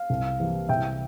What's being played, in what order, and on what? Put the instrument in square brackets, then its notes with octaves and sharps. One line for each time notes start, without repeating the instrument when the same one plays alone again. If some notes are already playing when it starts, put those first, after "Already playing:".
Already playing: [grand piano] F5
C2
C3 E3 A#3
C2 E5 G5